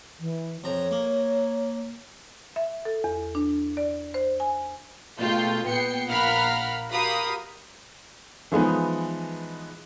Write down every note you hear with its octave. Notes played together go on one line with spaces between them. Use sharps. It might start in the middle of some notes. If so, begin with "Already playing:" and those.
E3
F2 C#5 A#5
A#3
E5
A4
E2
D4
D5
C5
G#5
B2 G#3 A3 F4 G5 G6
A#2 B3 G5 C7 C#7
A#1 A#4 F5 F#5 B5 F6
F#4 G4 A#4 F5 B5 D#6
E3 F3 G#3 B3 D#4